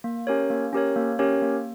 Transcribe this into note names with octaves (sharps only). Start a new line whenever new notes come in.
A#3
C#4 G4 A#4 C#5
A#3
C#4 G4 A#4 C#5
A#3
C#4 G4 A#4 C#5
A#3